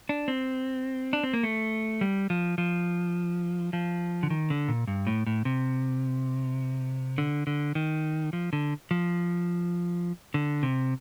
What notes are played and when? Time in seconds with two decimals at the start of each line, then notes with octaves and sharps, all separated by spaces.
0.09 D4
0.28 C4
1.13 D4
1.23 C4
1.33 A#3
1.43 A3
2.01 G3
2.30 F3
2.58 F3
3.73 F3
4.23 D3
4.30 D#3
4.50 D3
4.68 A#2
4.87 G2
5.07 A2
5.27 A2
5.45 C3
7.18 D3
7.47 D3
7.75 D#3
8.33 F3
8.53 D3
8.91 F3
10.34 D3
10.63 C3